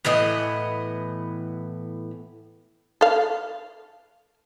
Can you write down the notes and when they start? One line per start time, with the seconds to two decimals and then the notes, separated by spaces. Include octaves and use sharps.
0.05 A2 E3 B3 D#5
3.01 A4 F5